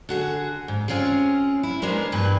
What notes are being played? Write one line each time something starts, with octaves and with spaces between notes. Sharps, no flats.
D3 F#4 G#4
G#2
G#3 C4 C#4 F4 G#4
E4
G#3 B3 D4 A#4 C5
G2 A#2 E3 A#3 B4